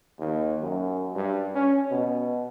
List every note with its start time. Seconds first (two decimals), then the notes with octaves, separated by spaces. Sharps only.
0.19 D#2
0.62 F#2
1.16 G2
1.54 C#4
1.91 B2